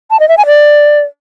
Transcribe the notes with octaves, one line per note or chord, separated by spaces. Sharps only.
A5
D#5
E5
G#5
D5